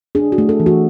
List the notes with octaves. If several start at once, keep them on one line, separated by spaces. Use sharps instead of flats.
D4 G#4
F#4
A3
A4
E3
F#4